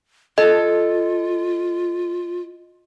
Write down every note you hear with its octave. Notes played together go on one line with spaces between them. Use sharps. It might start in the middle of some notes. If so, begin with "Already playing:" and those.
F4 A4 D#5